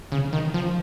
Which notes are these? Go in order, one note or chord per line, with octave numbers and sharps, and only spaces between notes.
C#3
D#3
F3